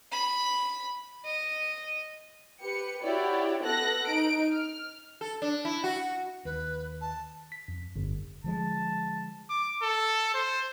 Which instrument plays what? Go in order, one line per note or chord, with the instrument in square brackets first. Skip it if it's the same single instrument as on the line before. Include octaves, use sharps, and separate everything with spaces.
[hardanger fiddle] B5
D#5
[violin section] G4 B4 C#7
E4 F#4 G4 C#5 D5
B3 A4 F#6 A#6
D#4 D7
F6
[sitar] A4
D4
E4
F#4
[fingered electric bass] D#2 [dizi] B4
[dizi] A5
[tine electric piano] B6
F2
G1
[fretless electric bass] D3 F3 G#3 [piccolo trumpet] A5
[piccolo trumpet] D6
A4
C5